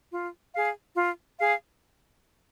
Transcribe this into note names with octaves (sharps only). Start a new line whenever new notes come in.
F4
G#4 F5
F4
G#4 F5